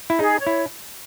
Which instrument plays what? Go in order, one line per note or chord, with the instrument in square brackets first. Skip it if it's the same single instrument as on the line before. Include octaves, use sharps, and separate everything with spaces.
[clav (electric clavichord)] E4
[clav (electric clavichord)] D#4 [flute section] G#4
[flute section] C#5
[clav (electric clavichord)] E4